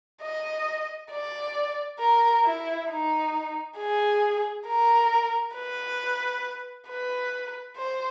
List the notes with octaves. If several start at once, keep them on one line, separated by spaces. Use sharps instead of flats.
D#5
D5
A#4
E4
D#4
G#4
A#4
B4
B4
C5